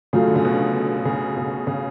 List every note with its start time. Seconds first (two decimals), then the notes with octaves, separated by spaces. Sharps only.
0.13 C#3 F#3 A3 F4
0.27 D3
0.35 C#3
0.45 B2
1.05 C#3
1.37 B2
1.67 C#3